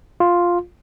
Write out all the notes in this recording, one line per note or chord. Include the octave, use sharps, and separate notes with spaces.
F4